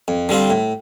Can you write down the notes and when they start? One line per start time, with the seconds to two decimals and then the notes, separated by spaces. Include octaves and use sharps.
0.08 F2
0.29 D3 G3 C4 F4
0.50 A2